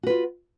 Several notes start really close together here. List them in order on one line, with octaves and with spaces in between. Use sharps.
F#4 B4 F4